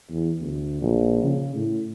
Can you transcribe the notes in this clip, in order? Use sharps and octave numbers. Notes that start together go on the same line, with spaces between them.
E2
D2
A#1
C#3
A2